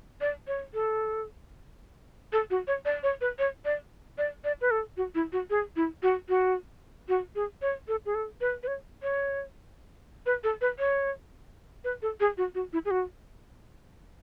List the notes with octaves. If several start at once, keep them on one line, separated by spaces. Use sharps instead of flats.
D5
C#5
A4
A4
F#4
C#5
D5
C#5
B4
C#5
D5
D5
D5
B4
A4
F#4
E4
F#4
G#4
E4
F#4
F#4
F#4
G#4
C#5
A4
G#4
A4
B4
B4
C#5
C#5
B4
A4
B4
C#5
B4
A4
G#4
F#4
F#4
E4
G#4
F#4